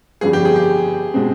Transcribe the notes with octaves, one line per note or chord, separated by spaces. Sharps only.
G1 F2 D3 G3 G#4
G4
G#4
G4
B2 G#3 C4